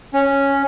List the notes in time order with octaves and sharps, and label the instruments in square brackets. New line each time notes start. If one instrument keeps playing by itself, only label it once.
[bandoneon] C#4